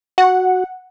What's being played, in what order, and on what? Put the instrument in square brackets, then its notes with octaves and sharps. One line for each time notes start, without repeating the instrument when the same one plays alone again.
[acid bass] F#4 [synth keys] F#5